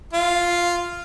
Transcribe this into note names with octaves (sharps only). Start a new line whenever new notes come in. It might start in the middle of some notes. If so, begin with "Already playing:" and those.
F4